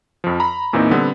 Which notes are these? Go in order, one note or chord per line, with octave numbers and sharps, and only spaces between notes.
F2 F3
A#5 B5
E2 A#2 E3 A#3 C4 D#4
D3 G3 B3 C4